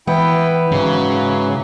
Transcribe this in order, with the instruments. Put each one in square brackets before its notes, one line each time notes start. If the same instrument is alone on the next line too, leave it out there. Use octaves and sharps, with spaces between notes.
[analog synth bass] E3 [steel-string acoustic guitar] B3 [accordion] E4 G5
[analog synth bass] G#2 [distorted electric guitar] C#3 [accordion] E3 F#3